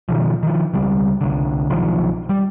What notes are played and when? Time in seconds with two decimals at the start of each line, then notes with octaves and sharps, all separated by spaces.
0.09 B2 D#3 F3
0.43 D#3 F3
0.74 C#2 G3
1.21 C2 D3
1.70 B1 D#3 F3
2.29 G3